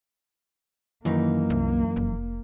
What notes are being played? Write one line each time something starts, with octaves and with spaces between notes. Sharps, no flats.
F#2 D#3 E3 A#3 D#4
C2
F1